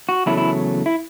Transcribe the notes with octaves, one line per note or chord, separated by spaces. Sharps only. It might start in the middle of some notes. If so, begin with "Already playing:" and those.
F#4
E2 C#3 F#3 A3 E4
E4
E4